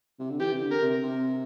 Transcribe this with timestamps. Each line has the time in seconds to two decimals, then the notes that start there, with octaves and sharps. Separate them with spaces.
0.19 C3
0.30 D3
0.40 E3 G4
0.52 C3
0.61 D3
0.71 A#4
0.82 C3
1.03 C3